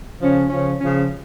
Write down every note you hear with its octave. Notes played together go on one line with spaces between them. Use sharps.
C#3 F3 C#4
C#3 F3 C#4
C#3 F3 C#4